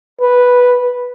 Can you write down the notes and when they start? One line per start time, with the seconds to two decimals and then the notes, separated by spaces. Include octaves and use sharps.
0.21 B4